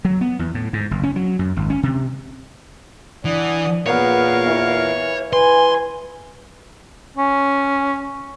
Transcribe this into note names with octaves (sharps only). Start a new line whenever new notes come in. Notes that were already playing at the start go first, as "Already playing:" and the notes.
F#3
B3
E2
A2
G#2
F#1
C#4
F#3
F#2
G#1
C#4
C3
E3 D4 F#5 D#6
E2 A#2 B3 A#4 C#5 F5
E3
E3 B4 G#5 C6
C#4